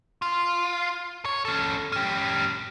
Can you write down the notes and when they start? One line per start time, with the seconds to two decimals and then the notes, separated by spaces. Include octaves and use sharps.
0.22 F4
1.25 C#5
1.45 C#4 A4
1.92 C#4 G4